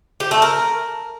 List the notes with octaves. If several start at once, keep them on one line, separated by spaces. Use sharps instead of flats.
G4
A3
A#4